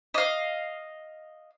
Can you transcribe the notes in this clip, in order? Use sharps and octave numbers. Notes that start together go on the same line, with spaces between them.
D#5 F5